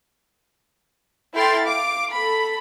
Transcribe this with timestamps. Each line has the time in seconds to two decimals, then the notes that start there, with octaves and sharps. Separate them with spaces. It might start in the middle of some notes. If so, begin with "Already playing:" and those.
1.35 E4 A4 G5 C6 F6 A6
1.65 F5 D6
2.13 A4 B5